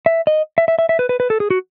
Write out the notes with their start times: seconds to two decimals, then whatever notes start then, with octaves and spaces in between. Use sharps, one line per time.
0.06 E5
0.27 D#5
0.58 E5
0.68 E5
0.79 E5
0.89 E5
0.99 B4
1.09 B4
1.20 B4
1.30 A4
1.40 G#4
1.50 F#4